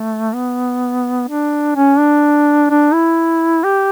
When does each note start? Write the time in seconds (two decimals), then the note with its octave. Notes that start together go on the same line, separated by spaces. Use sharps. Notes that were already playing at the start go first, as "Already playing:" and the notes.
Already playing: A3
0.33 B3
1.28 D4
1.76 C#4
1.98 D4
2.70 D4
2.93 E4
3.64 G4